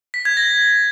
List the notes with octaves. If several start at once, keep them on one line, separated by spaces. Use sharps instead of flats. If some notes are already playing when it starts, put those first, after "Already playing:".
B6
G#6
A#6